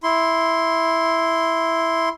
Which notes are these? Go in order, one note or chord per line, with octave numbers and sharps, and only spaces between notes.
E4 C6